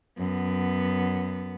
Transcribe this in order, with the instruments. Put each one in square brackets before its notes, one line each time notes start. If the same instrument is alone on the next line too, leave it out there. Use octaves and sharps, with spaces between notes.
[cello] F#2 B3